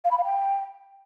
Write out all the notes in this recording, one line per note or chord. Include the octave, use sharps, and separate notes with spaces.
F5
B5
F5
G5